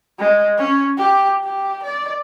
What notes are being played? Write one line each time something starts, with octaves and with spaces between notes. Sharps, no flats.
G#3
C#4
G4
G4
D5